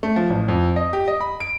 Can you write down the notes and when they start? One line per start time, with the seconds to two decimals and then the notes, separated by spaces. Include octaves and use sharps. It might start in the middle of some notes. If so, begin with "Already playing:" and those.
0.03 A3
0.16 F3
0.30 A1
0.48 F2
0.76 D#5
0.93 G4
1.08 D#5
1.21 B5
1.40 D7